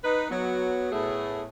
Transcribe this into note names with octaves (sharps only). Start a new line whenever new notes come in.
D#4 B4
F#3 B3
A2 A3 B3 G#4